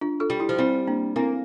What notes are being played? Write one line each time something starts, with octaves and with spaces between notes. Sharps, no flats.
D4 F4
F4 A4
G3
E4 G4
F3
G3 C4 E4
A#3 D4
A#3 C4 E4